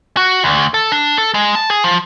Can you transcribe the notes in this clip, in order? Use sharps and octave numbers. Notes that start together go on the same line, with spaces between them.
F#4
D2
A4
D4
A4
G#3
A5
G#4
F3